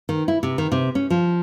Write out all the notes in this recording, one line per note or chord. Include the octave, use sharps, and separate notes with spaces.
D#3
E4
C3
D#3
C3
C#4
F3